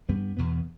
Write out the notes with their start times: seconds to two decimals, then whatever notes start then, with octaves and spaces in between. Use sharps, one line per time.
0.08 G2 G3 B3 D4
0.37 E2 B2 B3